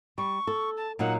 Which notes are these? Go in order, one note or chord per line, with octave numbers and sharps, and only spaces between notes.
G3 C#6
A4
A5
A#2 F#3 D#4 F#5